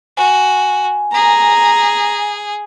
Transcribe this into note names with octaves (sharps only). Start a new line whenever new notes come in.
F#4 G#5
G#4 A#5